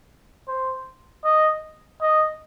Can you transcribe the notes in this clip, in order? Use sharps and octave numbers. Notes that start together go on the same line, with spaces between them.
C5
D#5
D#5